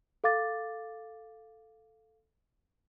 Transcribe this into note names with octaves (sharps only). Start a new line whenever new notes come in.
A4 F5 D6 A6